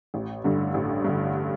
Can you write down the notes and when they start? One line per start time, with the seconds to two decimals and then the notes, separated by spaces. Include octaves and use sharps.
0.14 A1
0.44 G2 D3
0.74 A1
1.05 G2 D3